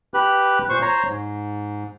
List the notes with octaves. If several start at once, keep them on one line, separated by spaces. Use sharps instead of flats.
G4 B4 F#6
A#2 C5 C#6
C5 C#5 A#5
G#2